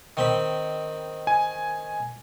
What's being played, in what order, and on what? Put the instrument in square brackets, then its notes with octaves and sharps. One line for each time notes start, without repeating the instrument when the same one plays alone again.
[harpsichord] D#3 C4 B5
[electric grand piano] G#5